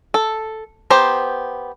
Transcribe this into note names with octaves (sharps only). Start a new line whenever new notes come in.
A4
B3 G4 C5 A#5